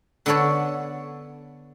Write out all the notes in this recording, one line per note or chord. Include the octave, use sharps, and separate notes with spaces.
D3 B3 D4 A4 C#5